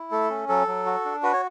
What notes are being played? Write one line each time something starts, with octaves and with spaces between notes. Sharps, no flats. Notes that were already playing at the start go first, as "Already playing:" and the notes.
Already playing: E4
A3 A4
C#4
F#3 A4
F#3
F#4
D4
F#4 B4
C#5